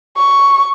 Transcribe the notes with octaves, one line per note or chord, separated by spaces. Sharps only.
C#6